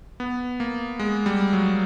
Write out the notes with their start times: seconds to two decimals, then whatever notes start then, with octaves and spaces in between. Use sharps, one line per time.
0.20 B3
0.60 A#3
0.99 G#3
1.26 G3
1.53 F#3